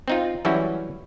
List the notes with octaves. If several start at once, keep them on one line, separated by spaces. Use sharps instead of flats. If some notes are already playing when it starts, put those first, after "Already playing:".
C4 D#4 F4
E3 F#3 G3 C#4 E4 F#4